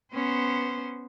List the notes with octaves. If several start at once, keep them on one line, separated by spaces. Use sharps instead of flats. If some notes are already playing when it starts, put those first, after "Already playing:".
B3 C#4 C5